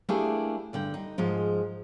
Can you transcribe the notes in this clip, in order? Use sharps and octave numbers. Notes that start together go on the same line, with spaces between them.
A3 A#3 D4 E4 G4 G#4
G2 D3 G5
D#4
G#2 F3 G#3 A#4